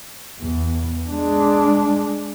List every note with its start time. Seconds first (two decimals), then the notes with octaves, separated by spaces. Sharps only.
0.40 E2
1.08 G#3 D4